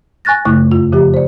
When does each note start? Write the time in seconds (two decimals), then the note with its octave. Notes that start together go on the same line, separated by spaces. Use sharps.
0.25 G#5 C#6 F#6 A6 A#6
0.45 F#2 C#3 A3 E4 C#6 F#6
0.71 F2 F4
0.92 C#3 F3 G4
1.14 C5 D5